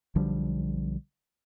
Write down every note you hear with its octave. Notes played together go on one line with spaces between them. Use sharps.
B1 D3 F3 G3